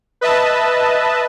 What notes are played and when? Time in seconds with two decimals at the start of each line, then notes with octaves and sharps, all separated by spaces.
0.21 B4 D#5 E5 A5